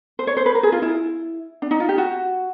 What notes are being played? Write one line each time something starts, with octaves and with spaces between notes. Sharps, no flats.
C5
C#5
C5
B4
A#4
G#4
F4
E4
D4
D#4
F4
G4
F#4